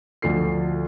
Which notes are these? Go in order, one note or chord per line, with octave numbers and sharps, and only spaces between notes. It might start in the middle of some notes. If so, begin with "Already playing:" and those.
D2 F3 D4 A4 C7